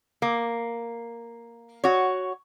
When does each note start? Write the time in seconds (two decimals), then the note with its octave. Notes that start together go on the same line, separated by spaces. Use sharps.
0.22 A#3
1.84 F#4 C#5